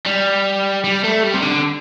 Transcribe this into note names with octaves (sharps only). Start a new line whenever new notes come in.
G3
G3
A3
G3
C3
D3